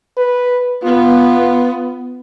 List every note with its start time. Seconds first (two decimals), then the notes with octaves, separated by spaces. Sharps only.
0.17 B4
0.84 B3 F4